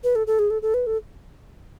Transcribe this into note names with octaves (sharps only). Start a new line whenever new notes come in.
B4
A4
A4
G#4
A4
A4
B4
A4